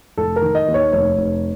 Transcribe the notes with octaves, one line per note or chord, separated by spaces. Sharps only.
F1 A4
A#4
D#3
D#5
D#2
C#5
F1 C#5
F1